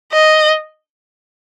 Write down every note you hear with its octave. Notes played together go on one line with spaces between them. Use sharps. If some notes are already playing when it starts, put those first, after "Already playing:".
D#5